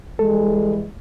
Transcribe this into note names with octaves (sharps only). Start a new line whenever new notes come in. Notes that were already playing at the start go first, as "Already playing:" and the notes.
E3 G3 G#3 A4